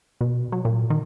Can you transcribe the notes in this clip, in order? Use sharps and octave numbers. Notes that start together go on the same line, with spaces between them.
B2
F#3
A#2
D#3